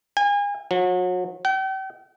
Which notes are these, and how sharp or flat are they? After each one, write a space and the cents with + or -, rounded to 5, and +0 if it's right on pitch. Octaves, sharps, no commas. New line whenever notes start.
G#5 -35
F#3 -35
G5 -40